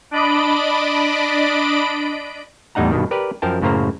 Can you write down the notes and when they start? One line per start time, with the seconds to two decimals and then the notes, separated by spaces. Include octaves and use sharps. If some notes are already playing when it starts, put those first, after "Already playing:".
0.11 D4 D5 D#5 B5 D7
2.75 E2 A2 G3 D#4 F#5 A#5
2.91 G2 B2 D#3
3.11 G4 A#4 B4 D5
3.42 F#2 F3 A#4 G5 A5
3.62 F#2 A2 C#3 A#3 C5 A#5